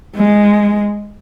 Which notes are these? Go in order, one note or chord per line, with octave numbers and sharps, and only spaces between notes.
G#3